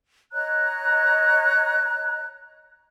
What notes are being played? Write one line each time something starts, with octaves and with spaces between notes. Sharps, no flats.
C#5 D#5 A#5 F#6